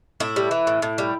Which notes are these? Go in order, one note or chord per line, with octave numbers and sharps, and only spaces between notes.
A2 E4
G3
E3
A2
A2
G3